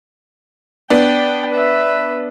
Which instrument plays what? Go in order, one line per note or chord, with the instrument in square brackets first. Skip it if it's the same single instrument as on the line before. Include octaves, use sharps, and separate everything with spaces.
[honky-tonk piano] B3 D4 [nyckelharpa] G5
[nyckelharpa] B4 E5